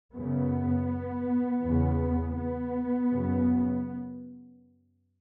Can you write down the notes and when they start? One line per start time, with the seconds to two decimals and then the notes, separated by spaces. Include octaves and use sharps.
0.13 F#2 C#3 B3
1.62 E2 C#3
2.37 B3
3.11 F#2 C#3